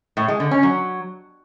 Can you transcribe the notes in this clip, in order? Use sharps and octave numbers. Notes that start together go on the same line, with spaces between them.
A2
G#3
D3
C#4
F#3